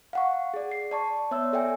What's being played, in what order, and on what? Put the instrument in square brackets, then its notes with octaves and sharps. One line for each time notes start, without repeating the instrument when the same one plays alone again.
[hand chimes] F5 F#5 C#6
G#4 D5
C7
D5 A5 C#6
B3 C#5 D5 E5 E6
A4 D5 E5 G5 G#5